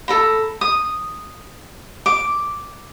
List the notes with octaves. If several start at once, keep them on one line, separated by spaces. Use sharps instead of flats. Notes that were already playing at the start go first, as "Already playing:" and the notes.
A4 A#5 B5
D#6
D6